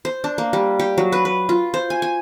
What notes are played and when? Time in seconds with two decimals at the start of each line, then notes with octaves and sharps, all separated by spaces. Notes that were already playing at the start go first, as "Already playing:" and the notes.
0.05 C5
0.24 D4
0.38 A#3
0.53 G3
0.79 G4
0.98 F#3
1.12 B4
1.25 B4
1.49 F4
1.74 C5
1.90 G#5
2.02 G#5